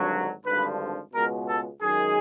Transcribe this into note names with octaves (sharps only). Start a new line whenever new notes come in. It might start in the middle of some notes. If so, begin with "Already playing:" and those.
Already playing: G#1 G2 D3 F#3
G#1 G2 D3 F3 B4
C#2 B2 G#3 A#4
A4
F#2 D#3 G#3 G#4